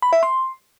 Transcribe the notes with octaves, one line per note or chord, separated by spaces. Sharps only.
B5
E5
C6